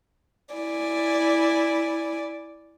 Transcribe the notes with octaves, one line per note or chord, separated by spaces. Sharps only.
E4 D5 G#5